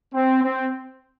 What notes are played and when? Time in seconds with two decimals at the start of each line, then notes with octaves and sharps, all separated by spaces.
0.14 C4
0.43 C4